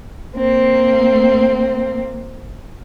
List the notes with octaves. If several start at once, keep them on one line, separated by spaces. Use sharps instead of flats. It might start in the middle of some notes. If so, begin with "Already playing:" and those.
A#3 C4